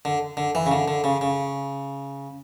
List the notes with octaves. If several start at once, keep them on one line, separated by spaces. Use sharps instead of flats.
D3
D3
E3
C#3
D3
D3
C#3
C#3